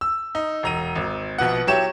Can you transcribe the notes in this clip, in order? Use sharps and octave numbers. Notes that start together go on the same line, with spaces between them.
E6
D#4
E1 A#5 D#7
G#1
A#1 B2 B3 F#5
F#3 E4 G4 C#5 E7